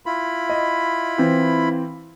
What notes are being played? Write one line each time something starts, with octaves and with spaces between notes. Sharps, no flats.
E4 F4 B5
D#5
E3 C4